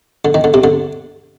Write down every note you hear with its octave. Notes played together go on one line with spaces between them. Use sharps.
D3
D#3
D3
C3
D3